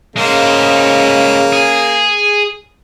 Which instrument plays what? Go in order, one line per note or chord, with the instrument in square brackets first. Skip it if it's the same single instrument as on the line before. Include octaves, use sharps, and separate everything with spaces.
[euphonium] C#3 [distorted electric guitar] G#3 C5 [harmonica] A#3
[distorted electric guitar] G#4